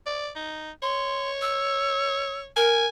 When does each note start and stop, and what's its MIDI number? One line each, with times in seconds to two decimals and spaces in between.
0.06 0.30 74
0.36 0.71 63
0.82 2.46 73
0.82 1.30 84
1.41 2.40 88
2.56 2.85 70
2.56 2.88 80